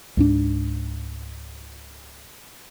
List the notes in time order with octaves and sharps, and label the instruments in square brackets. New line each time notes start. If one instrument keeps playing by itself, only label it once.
[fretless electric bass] C#2 G#2 D4